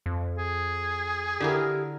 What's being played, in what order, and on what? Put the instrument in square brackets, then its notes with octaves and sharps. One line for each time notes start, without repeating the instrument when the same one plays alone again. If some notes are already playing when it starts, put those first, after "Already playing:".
[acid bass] F2
[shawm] G#4
[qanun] D3 E4 A#4 [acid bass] G4